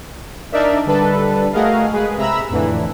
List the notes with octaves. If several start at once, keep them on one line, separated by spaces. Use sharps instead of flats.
D4 D#4 A#4 D5 E5
D3 G3 D4 A4 B4
A3 F#4 G#4 A#4 D#5 F5
G#3 G#4 B4
C3 E5 A#5 B5 E6
F2 A2 D3 E3